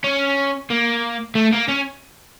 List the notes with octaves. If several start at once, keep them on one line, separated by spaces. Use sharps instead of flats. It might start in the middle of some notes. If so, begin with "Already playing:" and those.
C#4
A#3
A3
A#3
C#4